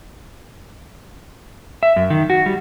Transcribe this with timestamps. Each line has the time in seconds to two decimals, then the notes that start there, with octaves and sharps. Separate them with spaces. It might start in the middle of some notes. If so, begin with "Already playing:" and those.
1.83 E5
1.96 F#2
2.10 D#3
2.30 F#4
2.46 G3